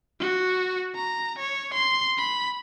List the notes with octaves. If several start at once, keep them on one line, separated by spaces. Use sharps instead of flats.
F#4
A#5
C#5
C6
B5